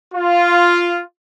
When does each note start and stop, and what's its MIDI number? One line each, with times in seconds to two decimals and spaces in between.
0.13 1.02 65